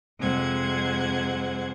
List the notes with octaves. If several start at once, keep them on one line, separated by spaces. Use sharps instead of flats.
F2 C3 G#3 C5 F#5 G#6